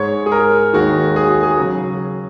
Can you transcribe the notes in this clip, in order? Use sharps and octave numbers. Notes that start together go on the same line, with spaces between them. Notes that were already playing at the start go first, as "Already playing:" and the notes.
Already playing: G#2 G#3 C#5
G#4
A#4
D#2 D#3 G#3 F#4
G#4
F#4
G#4
C#3 F#3 F#4